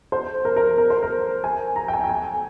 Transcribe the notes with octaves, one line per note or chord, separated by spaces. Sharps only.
C5
A#4
A#4
A#4
C5
A#4
G#5
A#5
G5
G#5
G5
G#5